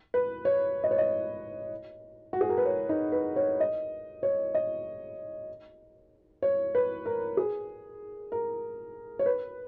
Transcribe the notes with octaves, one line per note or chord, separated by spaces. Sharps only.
B4
C#5
D#5
C#5
D#5
F#4
G#4
A#4
B4
C#5
D#4
B4
C#5
D#5
C#5
D#5
C#5
B4
A#4
G#4
A#4
C#5
B4